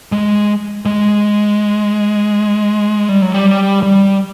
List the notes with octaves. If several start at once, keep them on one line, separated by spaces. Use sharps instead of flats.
G#3
G#3
G3
F#3
G3
G3